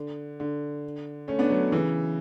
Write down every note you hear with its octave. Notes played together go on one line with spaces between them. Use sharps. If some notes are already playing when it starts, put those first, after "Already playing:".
Already playing: D3
D3
A3 C#4
B3 D4
F#3 A3
C#3 E3